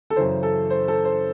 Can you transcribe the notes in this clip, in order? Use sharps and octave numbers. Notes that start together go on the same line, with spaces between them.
A4
F#2 C#3 E3 C5
A4
C5
A4
C5